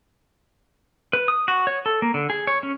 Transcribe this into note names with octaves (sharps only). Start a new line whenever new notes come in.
B4
D#6
F#4
C#5
A4
A#3
D3
G#4
C#5
C#4